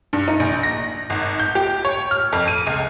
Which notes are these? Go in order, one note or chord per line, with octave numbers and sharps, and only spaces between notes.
G2
D#4
A#1
A#6
G#1
G6
G4
C#5
F6
F2
D#7
C#2